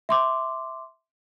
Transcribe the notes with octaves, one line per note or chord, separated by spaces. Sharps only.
E5 C6 D6